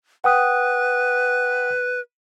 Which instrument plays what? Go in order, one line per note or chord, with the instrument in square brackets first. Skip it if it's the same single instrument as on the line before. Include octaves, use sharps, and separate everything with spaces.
[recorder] B4 [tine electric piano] F#5 G5 D#6